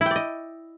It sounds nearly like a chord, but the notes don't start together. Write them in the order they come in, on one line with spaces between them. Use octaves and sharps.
E4 G5 D5 D#5